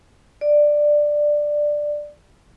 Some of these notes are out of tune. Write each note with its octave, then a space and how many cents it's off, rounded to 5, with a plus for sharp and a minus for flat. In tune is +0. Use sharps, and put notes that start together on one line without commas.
D5 +10